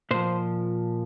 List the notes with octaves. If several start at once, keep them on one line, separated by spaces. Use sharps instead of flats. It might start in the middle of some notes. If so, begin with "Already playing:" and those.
A#2 F3 C5